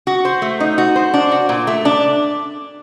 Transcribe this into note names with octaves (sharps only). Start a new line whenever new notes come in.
F#4
C5
A3
D#4
F#4
C5
D4
F#4
A#2
A3
D4